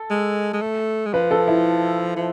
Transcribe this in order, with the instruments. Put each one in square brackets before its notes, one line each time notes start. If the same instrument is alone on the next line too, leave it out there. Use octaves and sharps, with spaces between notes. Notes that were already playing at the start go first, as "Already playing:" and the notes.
Already playing: [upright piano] A4
[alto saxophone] G#3
G#3
A3
G#3
[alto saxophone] F3 [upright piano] B4
[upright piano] A4
E4
[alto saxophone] F3